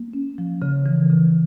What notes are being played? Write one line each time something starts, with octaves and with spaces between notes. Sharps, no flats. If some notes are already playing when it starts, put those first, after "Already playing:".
Already playing: A#3
C#4
F3
C#3
E3
C#3